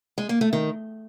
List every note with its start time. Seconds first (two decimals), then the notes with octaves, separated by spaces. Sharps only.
0.18 G#3
0.29 A#3
0.41 A3
0.53 D#3